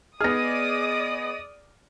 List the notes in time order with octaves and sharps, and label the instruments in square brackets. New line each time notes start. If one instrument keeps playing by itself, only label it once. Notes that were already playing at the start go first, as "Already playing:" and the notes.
[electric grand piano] B3 G#4 [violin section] D5 D#6 [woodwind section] D#5 [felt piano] F6 A#6